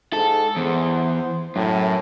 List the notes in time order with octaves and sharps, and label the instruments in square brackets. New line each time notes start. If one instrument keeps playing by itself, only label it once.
[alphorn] G#2 [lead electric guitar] A4
[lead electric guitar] E2 [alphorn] C5
[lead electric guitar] F#2 [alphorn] A2